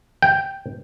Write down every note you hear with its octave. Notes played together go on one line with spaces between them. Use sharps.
G5